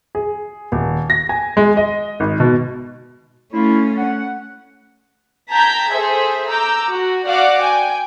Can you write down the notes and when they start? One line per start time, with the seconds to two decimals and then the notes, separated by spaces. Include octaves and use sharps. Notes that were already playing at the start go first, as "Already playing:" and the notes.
0.15 G#4
0.72 D#1
1.10 A#6
1.29 G#5
1.57 G#3
1.77 D#5
2.20 G#1
2.40 B2
3.53 A3 C#4 E4 F4
3.97 F#5
5.51 G5 A5 A#5 G6 G#6 B6
5.92 G#4 A4 C5 E5
6.49 A#5 D6 E6 G6
6.89 F#4
7.27 F#4 D5 F5 F#5 D6
7.62 G5 G#5